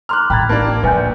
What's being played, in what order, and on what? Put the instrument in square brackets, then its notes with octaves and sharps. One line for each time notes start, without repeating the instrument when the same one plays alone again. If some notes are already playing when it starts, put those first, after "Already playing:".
[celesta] A#5 C6 D6 [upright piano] F6 F#6
[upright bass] A1 [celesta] G5 A#5 G#6 [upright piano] B5 A6
[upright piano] A#3 D4 [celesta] A5
[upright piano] A#1 [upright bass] G#3 [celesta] B4 G#5 G6